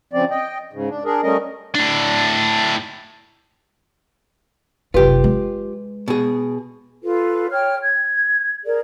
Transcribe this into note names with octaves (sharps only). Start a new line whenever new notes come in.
C#3 F3 C4 D5
D#5 G5
G#2 C#3
D4
D4 G#4 A#4
G3 A3 C#4 A#4 D#5
A2 D4
F#1 C2 F4 G4 B4
G#3
B2 G#4
F4 A4 B4
C#5 G5 F6
G#6
G#4 A#4 D5